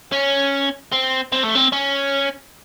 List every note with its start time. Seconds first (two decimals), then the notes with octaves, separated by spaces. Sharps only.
0.12 C#4
0.92 C4
1.32 C4
1.43 A3
1.55 C4
1.73 C#4